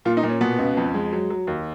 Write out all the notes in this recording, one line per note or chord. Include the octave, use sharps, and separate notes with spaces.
A#2 F4
D#4
A#2
C#4
B2 B3
C#2
F2
G#3
F#3
F#3
D#2